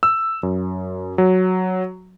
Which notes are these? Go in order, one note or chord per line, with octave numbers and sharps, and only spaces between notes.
E6
F#2
F#3